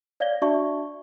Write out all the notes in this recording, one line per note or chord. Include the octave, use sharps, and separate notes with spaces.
C#5 D5 F5 G#6 A#6 G7
D4 F#4 D5 E5 A5 C#6